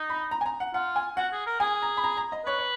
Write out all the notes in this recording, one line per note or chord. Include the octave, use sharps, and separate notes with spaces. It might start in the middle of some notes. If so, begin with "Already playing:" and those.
Already playing: D#4
B5
A#5
G#5
A#5
F#5
F4 F#5
G#5
F#4 F#5
G#4
A#4
G#4 G#5
A#5
B5
A#5
A#5
D#5
B4 C#5
C#5